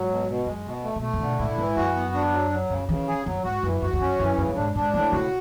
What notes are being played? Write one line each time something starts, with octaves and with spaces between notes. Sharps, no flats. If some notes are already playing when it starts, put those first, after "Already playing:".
Already playing: G#2 F#3
B2
B2
F#2 G#3
B2
A3
B2
A3
A2
B2 D3
A2 E4
G#2 E3
F#2 F#4
B3
D4
F#3
F#3
F#2 C#3
C#3 E3
G#4
F#2 F#3
G#2 F#4
F#2 E3
F#2 F#4
E2
F#2 C#4
F#2 E3
F#2 C#3
F#2
G#2 D4
G#2 D4
A2 E3
C#3 F#4